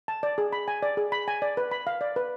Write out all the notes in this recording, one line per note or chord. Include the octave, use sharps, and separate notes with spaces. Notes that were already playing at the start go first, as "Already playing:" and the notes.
A5
D5
G#4
B5
G#5
D5
G#4
B5
G#5
D5
B4
B5
F5
D5
B4